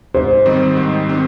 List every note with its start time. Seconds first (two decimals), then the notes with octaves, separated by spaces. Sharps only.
0.14 G#2 C5
0.46 D#3 G3 C4 D#4
0.77 G#2
1.07 D#3 G3 C4 D#4